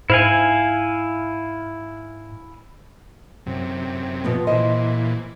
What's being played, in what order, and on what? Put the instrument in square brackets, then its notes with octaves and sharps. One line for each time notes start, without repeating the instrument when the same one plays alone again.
[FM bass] G#2 [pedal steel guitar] E4 F5 G#5
[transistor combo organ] F#2 C3
[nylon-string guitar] B2 F3 B3
[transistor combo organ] A#2 E3 [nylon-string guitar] C5 D#5